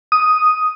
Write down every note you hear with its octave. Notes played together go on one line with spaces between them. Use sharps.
D#6